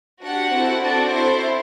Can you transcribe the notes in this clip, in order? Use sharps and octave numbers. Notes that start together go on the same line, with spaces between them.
D4 F#4 G4 F#5
C4 E4 A4
C4 D4 F#4 A4 D5
C4 E4 A4 C5